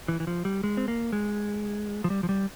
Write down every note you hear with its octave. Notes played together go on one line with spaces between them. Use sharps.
E3
E3
F3
G3
G#3
C4
A#3
G#3
F3
G3
F3
G3